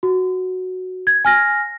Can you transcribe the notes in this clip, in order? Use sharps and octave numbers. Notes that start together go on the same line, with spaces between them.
F#4
G#6
G#5 F6 A#6